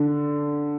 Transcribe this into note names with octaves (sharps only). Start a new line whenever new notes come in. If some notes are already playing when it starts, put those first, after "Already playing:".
Already playing: D3